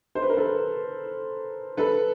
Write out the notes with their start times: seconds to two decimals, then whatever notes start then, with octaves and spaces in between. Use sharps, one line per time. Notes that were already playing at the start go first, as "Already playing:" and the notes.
0.15 C5
0.22 B4
0.29 A#4
0.37 A4 B4
1.77 A4 B4